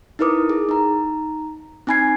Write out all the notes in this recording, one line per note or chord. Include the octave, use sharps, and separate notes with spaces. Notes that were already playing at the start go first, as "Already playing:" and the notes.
D#4 E4 A#4 B4 D6 D#6
G#4
D#4 A#5
C4 D#4 G#5 B5 G#6 C7